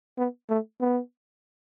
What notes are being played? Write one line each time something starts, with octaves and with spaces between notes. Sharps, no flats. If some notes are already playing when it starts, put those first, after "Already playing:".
B3
A3
B3